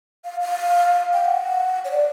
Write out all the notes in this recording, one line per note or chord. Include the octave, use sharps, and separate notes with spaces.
F5
F5
G5
F#5
C#5
D5